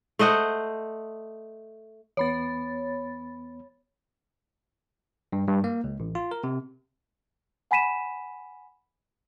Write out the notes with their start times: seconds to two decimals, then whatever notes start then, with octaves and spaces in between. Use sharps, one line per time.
0.19 A3 C5 D#5 F#5
2.17 E2 B3 C#5 B5 A6
5.33 G2
5.48 G2
5.64 A#3
5.84 C#2
6.00 A1
6.15 F4
6.31 A#4
6.44 C3
7.71 F#5 G#5 B5 B6 D#7 E7